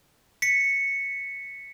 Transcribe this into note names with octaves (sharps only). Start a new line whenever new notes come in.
B6 C#7